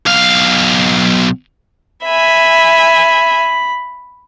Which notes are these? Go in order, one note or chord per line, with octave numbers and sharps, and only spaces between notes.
B1 F5
E5 G#5 B5